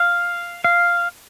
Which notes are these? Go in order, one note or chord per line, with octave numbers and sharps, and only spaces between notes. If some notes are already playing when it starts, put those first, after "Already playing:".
Already playing: F5
F5